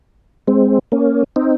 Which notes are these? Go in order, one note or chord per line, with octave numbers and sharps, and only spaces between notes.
G#3 C4
A#3 C#4
C4 D#4